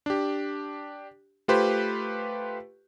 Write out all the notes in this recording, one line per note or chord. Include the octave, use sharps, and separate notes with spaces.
D4 G4
A3 F4 G4 B4 C5